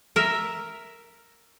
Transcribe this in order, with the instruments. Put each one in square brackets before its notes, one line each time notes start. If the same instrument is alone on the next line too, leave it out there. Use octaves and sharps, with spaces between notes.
[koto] A#4 E5